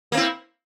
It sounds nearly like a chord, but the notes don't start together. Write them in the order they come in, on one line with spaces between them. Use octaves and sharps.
A#3 C4 E4